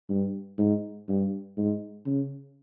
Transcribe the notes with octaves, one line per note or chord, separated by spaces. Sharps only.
G2
G#2
G2
G#2
C#3